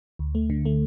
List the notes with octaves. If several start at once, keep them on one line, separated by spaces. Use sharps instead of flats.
D2
A3
D3
A3